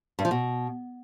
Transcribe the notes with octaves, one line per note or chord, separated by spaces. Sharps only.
G2
F3
B2